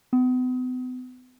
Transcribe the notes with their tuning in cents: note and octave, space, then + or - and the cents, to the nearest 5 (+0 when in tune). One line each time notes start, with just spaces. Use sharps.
B3 +40